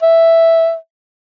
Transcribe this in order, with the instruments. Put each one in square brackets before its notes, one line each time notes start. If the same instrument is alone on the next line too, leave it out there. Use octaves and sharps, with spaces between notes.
[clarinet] E5